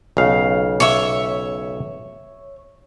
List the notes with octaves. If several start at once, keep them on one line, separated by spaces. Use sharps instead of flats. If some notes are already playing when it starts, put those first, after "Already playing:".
B1 C#3 F5
C#5 E5